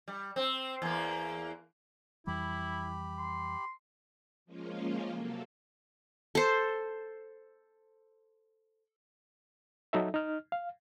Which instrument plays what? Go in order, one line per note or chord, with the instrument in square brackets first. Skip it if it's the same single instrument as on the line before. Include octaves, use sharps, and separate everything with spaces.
[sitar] G3
C4
E2 A#3
[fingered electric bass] F2 E3 G3 [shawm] E4 [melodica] G4 B5
[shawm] C6
[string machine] F3 G#3 A#3 C#4 F4
C3 F#3 A#3 A4
[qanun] A4 C5
[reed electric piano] F#3 D#4 A4 E5
D#4 F6
F5